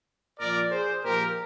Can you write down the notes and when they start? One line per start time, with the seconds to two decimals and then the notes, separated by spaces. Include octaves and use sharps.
0.39 A#2 F3 A#4 D5
0.71 G#4 C5
1.03 A#2 F3 G4 A#4